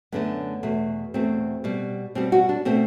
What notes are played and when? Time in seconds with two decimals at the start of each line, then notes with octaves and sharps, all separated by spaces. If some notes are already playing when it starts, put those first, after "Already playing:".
0.12 F#2 D3 A3 B3
0.63 E2 B2 A3
1.14 E2 B2 A3 C4
1.64 B2 G3
2.15 B2 G3 C4
2.32 F#4
2.49 D4
2.65 B2 A3 C4